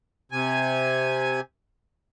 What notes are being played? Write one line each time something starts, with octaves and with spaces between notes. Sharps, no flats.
C3 G#5